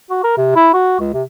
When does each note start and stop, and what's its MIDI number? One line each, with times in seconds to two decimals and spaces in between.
0.10 0.20 66
0.24 0.33 70
0.37 0.51 48
0.55 0.70 64
0.74 0.95 66
1.00 1.13 37
1.14 1.22 48